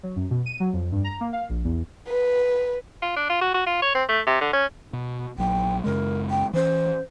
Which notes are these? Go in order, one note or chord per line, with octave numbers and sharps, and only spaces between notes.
F#3
F#2
B2
D#7
F#3
F2
G2
A#5
A#3
F5
A#1
E2
B4
F4
D4
F4
F#4
F#4
F4
C#5
C4
A3
C3
D3
C#4
B2
A#1 F#3 G5
F#2 C#3 G#3 A#4
G5
E3 C#4 C5